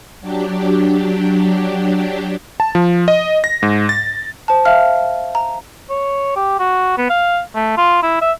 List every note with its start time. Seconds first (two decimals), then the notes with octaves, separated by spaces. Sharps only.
0.21 F#3 D4 G4
2.60 A5
2.75 F3
3.08 D#5
3.44 A#6
3.63 G#2
3.89 A6
4.48 C5 A5
4.65 E5 F5 F6
5.35 A#5
5.90 C#5
6.36 G4
6.59 F#4
6.98 B3
7.10 F5
7.55 A3
7.78 F4
8.03 E4
8.21 E5